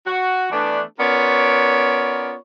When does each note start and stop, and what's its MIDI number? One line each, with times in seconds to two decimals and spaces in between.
0.06 0.47 66
0.51 0.81 52
0.51 0.81 57
0.51 0.81 59
0.51 0.81 62
0.98 2.33 59
0.98 2.33 61
0.98 2.33 65
0.98 2.33 70
0.98 2.33 73
0.98 2.33 74